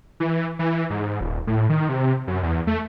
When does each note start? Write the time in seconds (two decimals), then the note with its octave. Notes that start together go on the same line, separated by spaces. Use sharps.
0.20 E3
0.59 E3
0.90 G#2
1.21 D#1
1.47 A2
1.70 D#3
1.89 C3
2.27 F#2
2.43 E2
2.67 A3